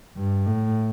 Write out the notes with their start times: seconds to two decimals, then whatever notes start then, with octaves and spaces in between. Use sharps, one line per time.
0.17 G2
0.47 A2